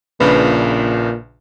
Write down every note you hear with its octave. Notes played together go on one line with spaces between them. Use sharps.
A#1 A#2 C#3 D4 B4